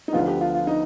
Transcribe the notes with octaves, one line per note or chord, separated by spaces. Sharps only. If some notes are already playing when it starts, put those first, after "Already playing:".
D#4
D2 D3 F3 B3 F4
G4
F4
F4
D#4